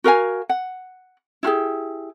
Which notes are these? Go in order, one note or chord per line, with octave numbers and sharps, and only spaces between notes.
F#4 A#4 F5 G#5
F#5
E4 F4 G4 G#4